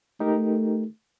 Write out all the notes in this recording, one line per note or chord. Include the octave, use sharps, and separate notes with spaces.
A3 D#4 G4 A#4